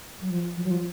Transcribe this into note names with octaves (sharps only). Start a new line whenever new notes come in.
F#3
F3
F3
F#3
F3